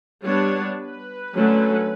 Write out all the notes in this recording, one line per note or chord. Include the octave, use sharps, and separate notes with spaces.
G3 B3 D4 C#5
B4
D3 F#3 A3 C#4